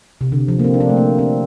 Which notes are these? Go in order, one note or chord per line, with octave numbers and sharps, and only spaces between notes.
C3
D3
F3
A#3
C4
D4
C4
A3
A#3
C4